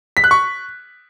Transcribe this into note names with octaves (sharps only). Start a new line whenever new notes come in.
B6
F#6
C#6